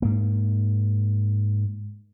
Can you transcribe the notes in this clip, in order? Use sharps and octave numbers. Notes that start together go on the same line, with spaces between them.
G#2 A#3